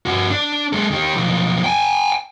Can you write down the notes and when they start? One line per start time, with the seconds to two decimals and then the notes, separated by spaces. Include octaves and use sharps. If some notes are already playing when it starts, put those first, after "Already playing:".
0.06 G2 F#4
0.30 D4
0.73 G#3 A4
0.91 D#3 G4
1.16 B1 F3
1.64 G5 G#5